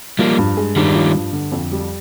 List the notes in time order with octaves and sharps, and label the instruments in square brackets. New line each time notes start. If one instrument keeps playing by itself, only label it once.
[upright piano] F3 [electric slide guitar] G3 A#3
[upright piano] G2
G#3
[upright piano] G2 [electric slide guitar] D#3 G3
[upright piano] F3
G2
D3
F2
G3